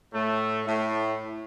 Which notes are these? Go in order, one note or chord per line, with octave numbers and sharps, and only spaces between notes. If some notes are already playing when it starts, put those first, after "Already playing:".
A2 A3
A2 A3